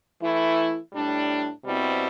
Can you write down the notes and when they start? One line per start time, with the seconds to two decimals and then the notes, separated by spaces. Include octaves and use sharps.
0.21 E3 A3 E4
0.93 A2 G3 D4
1.64 B2 G3 C4 E4